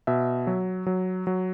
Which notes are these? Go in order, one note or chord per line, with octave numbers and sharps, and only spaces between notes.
B2 E5
F#3
F#3
F#3